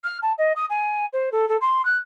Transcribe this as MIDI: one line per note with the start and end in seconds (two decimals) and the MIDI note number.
0.04 0.18 89
0.22 0.32 81
0.38 0.52 75
0.56 0.66 87
0.70 1.06 80
1.13 1.30 72
1.32 1.48 69
1.49 1.57 69
1.61 1.84 84
1.85 1.97 90